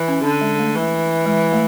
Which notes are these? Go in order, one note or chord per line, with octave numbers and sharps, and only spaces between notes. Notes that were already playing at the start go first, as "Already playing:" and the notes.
Already playing: E3
C#4
D3 D4
G#3
A3
E3
G#3
A3